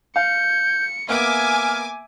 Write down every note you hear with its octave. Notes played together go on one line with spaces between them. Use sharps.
F5 G6 C#7
A#3 B3 E5 G#5 D6 F6